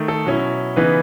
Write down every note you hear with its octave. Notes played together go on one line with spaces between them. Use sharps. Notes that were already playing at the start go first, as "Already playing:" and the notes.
Already playing: D#3 A3
A4
B2 F#3 C#4 E4
C#3 E3 B3 D#4 B4